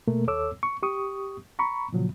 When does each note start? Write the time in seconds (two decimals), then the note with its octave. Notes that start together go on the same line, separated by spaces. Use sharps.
0.07 B2 A3 A#3 A#4
0.27 D#2 A4 C#5 D6 E6
0.63 C#6
0.83 G4 C#6 D#6
1.59 A#5 B5 C#6
1.93 A#2 C#3 F3 F#3